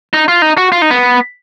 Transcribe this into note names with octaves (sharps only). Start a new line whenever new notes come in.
D#4
F4
D#4
F#4
F4
D#4
B3